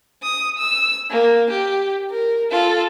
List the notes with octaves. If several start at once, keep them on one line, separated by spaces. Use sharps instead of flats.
D#6
E6
A#3
G4
A#4
F4 A4